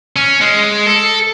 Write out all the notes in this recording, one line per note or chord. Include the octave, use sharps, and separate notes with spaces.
C#4
G#3
A4